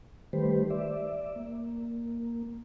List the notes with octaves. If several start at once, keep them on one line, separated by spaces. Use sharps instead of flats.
D#3 G3 A3 G4 B4 C5
D5 E5
A#3